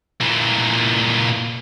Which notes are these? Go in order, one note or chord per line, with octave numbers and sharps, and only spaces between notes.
A#2 E3